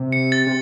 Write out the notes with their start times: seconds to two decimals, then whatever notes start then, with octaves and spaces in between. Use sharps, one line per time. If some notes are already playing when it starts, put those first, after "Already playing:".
Already playing: C3
0.12 C#7
0.32 A6
0.46 C3